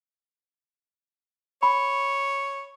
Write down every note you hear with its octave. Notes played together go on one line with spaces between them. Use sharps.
C#5 B5